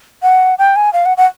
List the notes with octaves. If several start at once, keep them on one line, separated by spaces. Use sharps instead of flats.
F#5
G5
G#5
F5
F#5
F#5